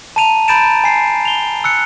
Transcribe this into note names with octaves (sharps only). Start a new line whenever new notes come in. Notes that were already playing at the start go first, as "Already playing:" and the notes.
A5 A#5 D#7 F7
A#5 B5 G6 A6 D7 E7
G#5 C7
F7 G7
E6 F#6 C#7